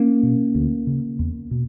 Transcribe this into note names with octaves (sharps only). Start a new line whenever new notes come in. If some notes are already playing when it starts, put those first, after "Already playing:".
Already playing: A#3 C#4
B2
D2
C#3
E2
B2